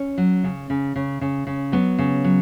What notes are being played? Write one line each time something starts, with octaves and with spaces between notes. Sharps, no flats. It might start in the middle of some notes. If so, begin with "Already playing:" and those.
Already playing: C#4
F#3
C#3
C#3
C#3
C#3
C#3
F#3 B3
C#3
F#3